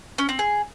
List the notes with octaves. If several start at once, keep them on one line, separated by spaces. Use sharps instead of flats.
C#4
C4
G#4